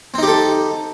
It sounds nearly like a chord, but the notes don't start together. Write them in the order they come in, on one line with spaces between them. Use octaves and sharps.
C4 D#4 G4 A4